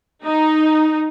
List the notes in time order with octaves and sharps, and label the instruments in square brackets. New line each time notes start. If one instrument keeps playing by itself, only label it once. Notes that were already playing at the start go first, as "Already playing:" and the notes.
[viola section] D#4